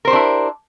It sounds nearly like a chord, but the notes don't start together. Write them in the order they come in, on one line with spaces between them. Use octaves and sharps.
A#4 C5 G4 D4 E4